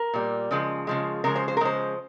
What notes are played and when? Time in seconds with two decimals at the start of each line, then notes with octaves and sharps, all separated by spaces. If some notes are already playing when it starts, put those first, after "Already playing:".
Already playing: A#4
0.13 A#2 G3
0.51 C#3 F3 G#3
0.87 C#3 F3 G#3
1.24 C#3 F3 G#3 A#4
1.36 C5
1.48 C5
1.57 A#4
1.61 C#3 F3 G#3 C5